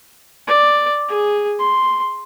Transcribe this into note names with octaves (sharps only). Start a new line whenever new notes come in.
D5
G#4
C6